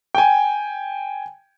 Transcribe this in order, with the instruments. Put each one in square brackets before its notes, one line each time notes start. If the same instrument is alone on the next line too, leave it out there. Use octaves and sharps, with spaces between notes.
[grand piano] G5 G#5